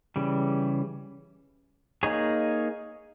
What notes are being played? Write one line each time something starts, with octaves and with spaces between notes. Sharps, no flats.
C#3 E3 G3
A#3 D#4 G#4 C#5